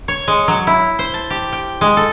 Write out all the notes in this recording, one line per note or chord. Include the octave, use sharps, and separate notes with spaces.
C#5
G#3
F#3
E4
C5
A5
G4
G5
G#3
A4